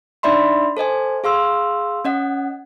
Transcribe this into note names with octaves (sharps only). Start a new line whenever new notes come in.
D4 D#4 D5 E5 B5 C6
A4 C5 D#5 G#5
G#4 F5 C6 E6
C#4 D#5 F#5